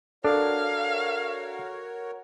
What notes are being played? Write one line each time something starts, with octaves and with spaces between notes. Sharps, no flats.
D4 F#4 A4 A#4 C#5 F5